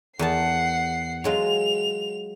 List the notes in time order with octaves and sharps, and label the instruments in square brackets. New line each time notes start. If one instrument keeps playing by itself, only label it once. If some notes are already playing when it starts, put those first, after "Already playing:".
[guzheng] E2 A#4 A5 [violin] F#5 C7
[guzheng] F#3 G#3 F4 [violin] F7